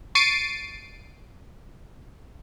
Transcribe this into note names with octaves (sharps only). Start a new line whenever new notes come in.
C#6 A6 C7 D7 D#7